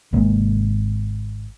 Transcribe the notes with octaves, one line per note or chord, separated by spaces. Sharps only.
G#1 C3 G#3 A#3